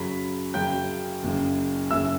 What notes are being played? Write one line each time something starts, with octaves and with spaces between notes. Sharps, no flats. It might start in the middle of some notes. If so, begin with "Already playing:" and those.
Already playing: F#2 C#3 F#3 B5 B6
F#2 C#3 F#3 G5 G6
F#1 F#2 C#3
F#1 F#2 C#3 E5 E6